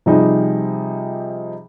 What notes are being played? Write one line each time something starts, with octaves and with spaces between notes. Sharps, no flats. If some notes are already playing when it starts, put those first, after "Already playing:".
C3 F3 G3 D#4 G#4